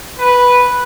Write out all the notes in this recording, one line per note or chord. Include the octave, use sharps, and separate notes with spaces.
B4